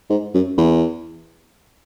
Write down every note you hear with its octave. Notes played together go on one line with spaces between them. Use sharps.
G#2
F#2
E2